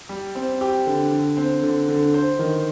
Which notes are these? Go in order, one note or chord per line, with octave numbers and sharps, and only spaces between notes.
G3
C4
G4
D3
D3
C4
D3
D3
C5
D#3